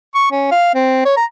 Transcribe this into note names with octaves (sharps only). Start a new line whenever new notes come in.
C#6
C#4
F5
C4
C#5
A#5